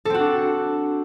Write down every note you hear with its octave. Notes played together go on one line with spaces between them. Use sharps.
C4 D4 F#4 A4